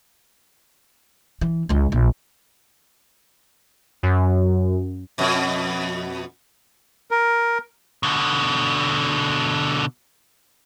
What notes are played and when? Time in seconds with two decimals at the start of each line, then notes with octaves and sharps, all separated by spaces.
1.41 E3
1.69 C#2 G#3
1.92 A#1
4.03 F#2
5.18 F2 B2
7.11 A#4
8.03 B2 D3